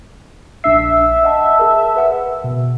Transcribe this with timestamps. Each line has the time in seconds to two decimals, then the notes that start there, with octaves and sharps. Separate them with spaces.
0.64 A#1 D4 E5 C7
1.23 D#5 F#5 A5
1.57 G#4 A#4 A5
1.96 B4 F#5 E6
2.44 B2